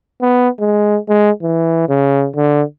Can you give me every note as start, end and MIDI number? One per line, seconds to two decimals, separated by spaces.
0.21 0.49 59
0.60 0.97 56
1.09 1.30 56
1.43 1.84 52
1.89 2.27 49
2.36 2.63 50